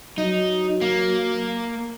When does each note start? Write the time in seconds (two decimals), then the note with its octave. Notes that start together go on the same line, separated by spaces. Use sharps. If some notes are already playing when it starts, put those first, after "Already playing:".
0.18 F#3 D#4
0.81 A#3